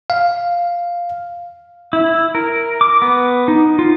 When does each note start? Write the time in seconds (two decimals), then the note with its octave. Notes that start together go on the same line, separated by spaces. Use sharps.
0.10 F5
1.93 E4
2.35 A#4
2.81 D6
3.02 B3
3.48 D#4
3.79 F4